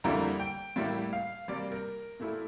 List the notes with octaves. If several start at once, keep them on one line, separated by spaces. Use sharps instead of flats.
F2 D3 G3 A#3 E4 A#5
G5
A2 G3 A#3 E4
F5
C3 G3 A#3 D5
A#4
A#2 A3 E4